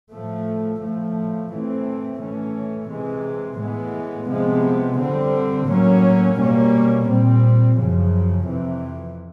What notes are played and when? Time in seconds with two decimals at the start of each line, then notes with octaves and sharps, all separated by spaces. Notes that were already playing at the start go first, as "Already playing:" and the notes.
0.12 A2 F3 A3
0.82 A2 F3 A3
1.52 A2 E3 A3 C4
2.21 A2 E3 A3 C#4
2.90 C3 E3 G#3
3.59 A2 E3 G#3 B3
4.29 C3 F3 G#3 B3
4.99 D3 G3 C4
5.68 A2 F#3 A#3 C#4
6.38 B2 G3 A#3 C#4
7.07 A#2 G3 C4
7.77 F#2 C#3 F3
8.46 F2 C3 E3